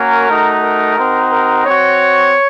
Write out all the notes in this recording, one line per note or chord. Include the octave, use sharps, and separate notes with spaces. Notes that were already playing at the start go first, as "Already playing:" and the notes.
Already playing: A#3 C#4 F#4 A#4
A3 D#4 F#4
A#4
C4 D#4 F#4
A#4
C4 F#4 C#5